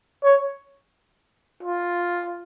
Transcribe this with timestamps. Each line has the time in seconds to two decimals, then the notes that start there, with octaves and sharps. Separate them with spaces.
0.23 C#5
1.63 F4